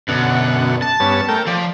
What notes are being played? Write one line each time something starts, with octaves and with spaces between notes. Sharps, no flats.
F#2 B2 D3 F#5
A5
G2 B3 C#4
A3 A#4 G5
F3 D5